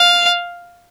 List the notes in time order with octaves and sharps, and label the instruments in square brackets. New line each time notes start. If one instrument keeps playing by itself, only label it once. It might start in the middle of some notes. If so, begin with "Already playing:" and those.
Already playing: [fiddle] F5